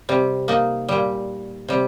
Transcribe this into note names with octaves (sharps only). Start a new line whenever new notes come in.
C3 G3
A#3 D#4
A#2 G3
C3 G3